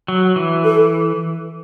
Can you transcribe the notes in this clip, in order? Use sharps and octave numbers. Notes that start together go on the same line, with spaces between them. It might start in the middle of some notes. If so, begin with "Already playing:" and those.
F#3
E3
A4